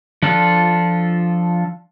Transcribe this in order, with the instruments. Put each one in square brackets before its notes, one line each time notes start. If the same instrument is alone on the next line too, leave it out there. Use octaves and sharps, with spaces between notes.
[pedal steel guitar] F3 D4 F4 A4